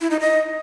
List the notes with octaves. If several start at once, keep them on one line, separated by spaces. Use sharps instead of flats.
E4
D#4
D#5